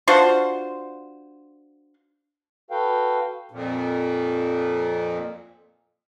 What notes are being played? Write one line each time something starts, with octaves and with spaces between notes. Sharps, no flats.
D4 F4 F#4 C5
F#4 A4 B4 F5 G5
F2 A#2